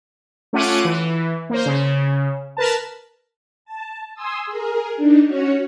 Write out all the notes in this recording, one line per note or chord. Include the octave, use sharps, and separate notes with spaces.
A3 C#4 F4 F#5 D6 D#7
E3
A#3 C5
C#3
A#4 B4 A5
A5
G#5 C6 D#6 E6
G#4 A#4
D4 D#4
C#4 F#4 C#5